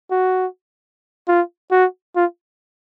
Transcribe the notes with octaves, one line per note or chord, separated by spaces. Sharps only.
F#4
F4
F#4
F4